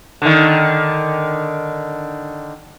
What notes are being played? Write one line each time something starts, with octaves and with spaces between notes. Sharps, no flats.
D3 D#3